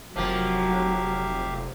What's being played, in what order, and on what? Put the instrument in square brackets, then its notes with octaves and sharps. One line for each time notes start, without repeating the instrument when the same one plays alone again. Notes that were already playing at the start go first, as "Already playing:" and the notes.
[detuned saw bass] F1 [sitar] F3 A#3 [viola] F#3 [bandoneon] G4 E5 F5